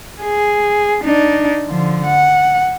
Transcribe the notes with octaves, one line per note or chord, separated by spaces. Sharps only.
G#4
D4 D#4
D3 F3
F#5